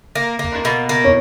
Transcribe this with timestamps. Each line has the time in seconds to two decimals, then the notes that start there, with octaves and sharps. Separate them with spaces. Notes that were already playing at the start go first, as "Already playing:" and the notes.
0.15 A#3
0.39 A#3
0.65 B2
0.89 A#3
1.04 C#5